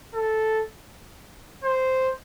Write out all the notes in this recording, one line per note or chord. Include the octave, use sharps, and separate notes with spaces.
A4
C5